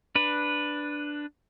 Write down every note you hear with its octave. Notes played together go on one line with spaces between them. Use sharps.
D4 B4